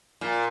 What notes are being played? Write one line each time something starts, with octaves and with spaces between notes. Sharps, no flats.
A#2